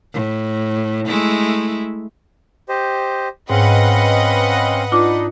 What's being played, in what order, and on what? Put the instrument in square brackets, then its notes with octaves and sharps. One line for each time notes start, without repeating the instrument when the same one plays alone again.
[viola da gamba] A2
G#3 A3 E4
[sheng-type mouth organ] G4 C5 D#5
[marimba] G#2 [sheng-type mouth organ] C4 C#4 F5 [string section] B4 D#5 F#5
[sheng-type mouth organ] D4 D#4 [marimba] F4 D6